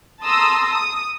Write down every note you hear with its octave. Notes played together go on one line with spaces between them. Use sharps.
A5 A#5 C6 D#6 E6 A#6
D#6